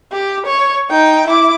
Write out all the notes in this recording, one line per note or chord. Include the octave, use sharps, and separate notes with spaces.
G4
C#5
D#4 G5
E4 D6